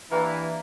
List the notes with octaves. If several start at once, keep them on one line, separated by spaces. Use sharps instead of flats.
E3 A#3 D4 G4 A#4